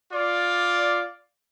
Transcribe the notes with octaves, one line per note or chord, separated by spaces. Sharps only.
F4 D5